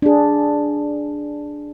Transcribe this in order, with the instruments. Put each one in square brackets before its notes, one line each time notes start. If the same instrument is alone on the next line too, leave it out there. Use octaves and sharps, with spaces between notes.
[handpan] D4 G#4